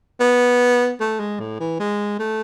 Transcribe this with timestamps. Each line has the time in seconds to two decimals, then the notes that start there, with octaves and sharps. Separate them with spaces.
0.20 B3
1.00 A3
1.20 G#3
1.40 A2
1.60 E3
1.80 G#3
2.19 A3